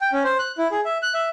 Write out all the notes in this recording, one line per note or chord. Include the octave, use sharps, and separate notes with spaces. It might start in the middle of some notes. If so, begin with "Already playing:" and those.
G5
C#4
C5
F#6
E4
G#4
E5
F#6
E5